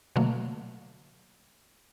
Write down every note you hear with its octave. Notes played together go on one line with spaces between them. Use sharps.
B2 D3 F#3 A3 A#3